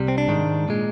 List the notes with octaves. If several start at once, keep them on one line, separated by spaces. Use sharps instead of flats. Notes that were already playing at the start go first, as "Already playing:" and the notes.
Already playing: C2 C3 G3
C4
D4
G#2 D#3 G#3
A#2 G#3